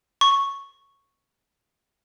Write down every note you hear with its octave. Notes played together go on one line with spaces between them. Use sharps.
C#6